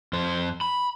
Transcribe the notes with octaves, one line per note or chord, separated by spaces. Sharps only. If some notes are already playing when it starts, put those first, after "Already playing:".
F2 C5
B5